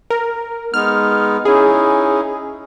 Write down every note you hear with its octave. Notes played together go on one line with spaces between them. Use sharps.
A#4
G#3 B3 D#4 F6
C#4 D#4 E4 G#4